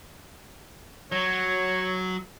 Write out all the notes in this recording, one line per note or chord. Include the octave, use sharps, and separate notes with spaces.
F#3 C#5